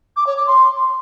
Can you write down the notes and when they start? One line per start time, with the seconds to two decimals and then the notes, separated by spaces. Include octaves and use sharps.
0.16 D6
0.26 C#5
0.37 D6
0.47 C6